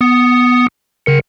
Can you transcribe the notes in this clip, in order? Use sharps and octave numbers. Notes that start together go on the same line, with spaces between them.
B3 D#6 C#7
C#3 A#4 C#7